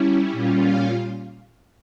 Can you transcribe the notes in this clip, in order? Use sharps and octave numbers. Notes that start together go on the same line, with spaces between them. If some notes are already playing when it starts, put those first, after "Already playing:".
Already playing: G3 C#4 E4
A#2 G3 C#4 F4
F5